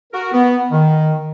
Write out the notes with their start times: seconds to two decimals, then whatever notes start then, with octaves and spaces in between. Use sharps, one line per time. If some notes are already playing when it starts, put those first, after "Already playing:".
0.13 F#4 A#4
0.32 B3
0.71 D#3